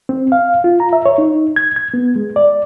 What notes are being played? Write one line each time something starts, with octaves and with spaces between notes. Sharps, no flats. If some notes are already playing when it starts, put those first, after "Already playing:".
C4
F5
F4
A#5
E5
C#5
D#4
G#6
G#6
B3
G#3
D5